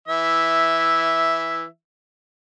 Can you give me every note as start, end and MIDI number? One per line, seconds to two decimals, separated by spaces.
0.08 1.65 52
0.08 1.65 76